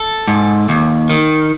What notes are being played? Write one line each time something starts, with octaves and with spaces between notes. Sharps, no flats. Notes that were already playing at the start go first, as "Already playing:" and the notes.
Already playing: A4
G#2
D#2
D#3